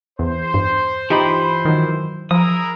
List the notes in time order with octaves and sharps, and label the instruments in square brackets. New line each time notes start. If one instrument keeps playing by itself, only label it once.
[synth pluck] E2 [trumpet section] C5
[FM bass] G2
[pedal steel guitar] E3 F4 B5 [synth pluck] D#4 G4
[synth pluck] D#3 F#3
[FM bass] F3 [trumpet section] E4 G#4 A#4 [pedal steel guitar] D#6